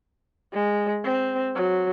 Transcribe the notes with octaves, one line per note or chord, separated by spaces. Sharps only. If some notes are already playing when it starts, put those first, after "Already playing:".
G#3
C4
F#3